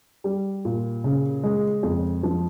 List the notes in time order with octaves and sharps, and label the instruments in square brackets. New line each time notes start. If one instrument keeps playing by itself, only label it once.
[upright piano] G3
A#2
C#3
G#3
F2
F3